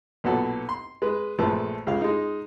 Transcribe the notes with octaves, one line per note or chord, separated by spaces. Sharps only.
B1 A#2 B3 F#4 A4 C#5
C6
G#3 B4
A#1 F3 G#3 A3 A4 B4
C#2 C#3 F5
G#3 D#4